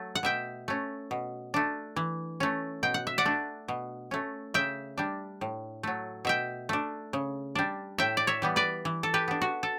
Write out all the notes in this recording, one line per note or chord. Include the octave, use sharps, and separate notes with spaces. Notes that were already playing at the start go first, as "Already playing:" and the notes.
Already playing: F#3 A3
F#5
B2 E5 G5
A3 C#4
B2
A3 D4
E3
A3 C#4
B2 G5
F#5
E5
D5 F#5
A3 D4
B2
A3 C#4
C#3 E5 G5
G3 D4
A2
F#3 A3
B2 E5 G5
A3 D4
C#3
G3 D4
A2 E5 G5
D5
C#5 E5
E3 G3 B3
B4 D5
E3
A4
G4 B4
B3 D4
F#4
A4